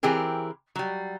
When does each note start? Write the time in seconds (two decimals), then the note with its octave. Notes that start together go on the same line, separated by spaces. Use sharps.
0.03 E3 C4 G4 G#4 A#4
0.76 F#3 G3